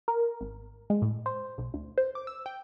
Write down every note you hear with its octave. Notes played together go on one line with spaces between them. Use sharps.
A#4
G#1
G#3
A2
C5
B1
D2
C5
D6
E6
G5